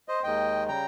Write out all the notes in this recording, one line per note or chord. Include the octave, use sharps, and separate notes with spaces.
C5 D#5
D#2 D#3 G#3 D#5 G5
C#3 G3 G5 A#5